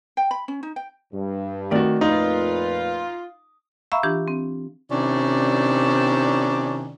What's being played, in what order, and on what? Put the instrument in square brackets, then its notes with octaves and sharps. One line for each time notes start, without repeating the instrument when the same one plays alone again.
[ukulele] G5
B5
C#4
D#4
G5
[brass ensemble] G2
[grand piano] D#3 F#4 [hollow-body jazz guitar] A3 C4 D5
[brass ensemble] F2 A#2 B4 [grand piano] D#4 [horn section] F4
[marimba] E5 F5 A#5 B5 C#6 E6
E3 D4 F4 G4
C4
[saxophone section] C3 D#3 C#4 D4 E4 D5